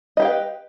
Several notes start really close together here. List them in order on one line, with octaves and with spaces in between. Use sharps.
D#5 G4 G5 F5 B4